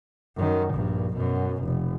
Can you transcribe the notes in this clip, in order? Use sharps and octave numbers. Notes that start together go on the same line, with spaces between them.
F#2 D#3
A#1 G2
F#2 B2
F1